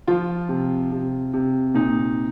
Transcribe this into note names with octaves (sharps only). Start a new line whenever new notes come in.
F3 F4
C3
C3
C3
A#2 D#4